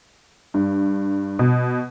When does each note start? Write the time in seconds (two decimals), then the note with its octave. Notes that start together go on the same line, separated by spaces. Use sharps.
0.54 G2
1.39 B2